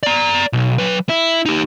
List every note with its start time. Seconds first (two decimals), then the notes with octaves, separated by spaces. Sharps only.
0.03 D5 A#5
0.53 B1
0.78 F#3 B4
1.09 E4
1.46 D#4 G4